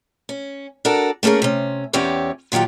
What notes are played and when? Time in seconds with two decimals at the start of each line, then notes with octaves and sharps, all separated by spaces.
0.29 C#4
0.85 D4 F#4 A4 A#4
1.23 A3 A#3 C#4 G#4 A#4
1.42 C3 C#4
1.93 E2 C4 C#4 G4 C#5 D5
2.52 A#2 D#3 F#3 F4 G4